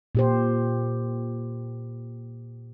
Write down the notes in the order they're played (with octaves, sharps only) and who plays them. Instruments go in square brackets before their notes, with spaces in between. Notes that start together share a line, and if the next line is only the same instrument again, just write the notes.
[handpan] A#2 G4 C5